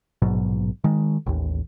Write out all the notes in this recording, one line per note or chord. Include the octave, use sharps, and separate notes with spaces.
A#1 G#2 B2 F#3
D#3 G#3
A1 D#2